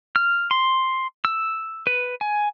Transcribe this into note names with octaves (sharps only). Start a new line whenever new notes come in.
F6
C6
E6
B4
G#5